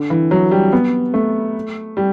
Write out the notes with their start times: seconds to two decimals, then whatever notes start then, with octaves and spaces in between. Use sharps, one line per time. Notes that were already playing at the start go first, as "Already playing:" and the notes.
Already playing: D3
0.10 E3
0.31 F#3
0.51 G3
0.73 B3
1.14 A3
1.97 G3